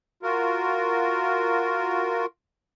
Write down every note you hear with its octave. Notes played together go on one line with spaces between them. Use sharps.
F4 F#4 A#4